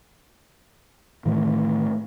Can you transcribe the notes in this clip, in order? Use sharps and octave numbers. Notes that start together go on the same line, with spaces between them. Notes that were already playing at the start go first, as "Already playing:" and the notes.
A2 D#3 E3 A3